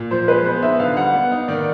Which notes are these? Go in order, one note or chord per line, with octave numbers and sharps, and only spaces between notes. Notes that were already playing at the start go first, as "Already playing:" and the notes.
Already playing: A#2
F3 C5
G#3 B4
B3 C5
D#4 E5
D3 F5
G3 F#5
B3
D#4 D#5
D#3 D5